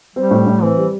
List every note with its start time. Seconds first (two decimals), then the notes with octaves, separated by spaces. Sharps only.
0.16 G3 C4
0.31 A2
0.47 A2
0.62 E3 C4
0.77 G3